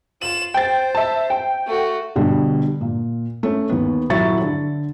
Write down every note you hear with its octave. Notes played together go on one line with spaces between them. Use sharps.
F4 E7 F#7
C5 G5 A6
E5 A5
G5
A3 F#4
B2 D3 G3
A#2
A3 C#4
D#2 B3
D#1 F#3 E4 E5 C#6 A6
D3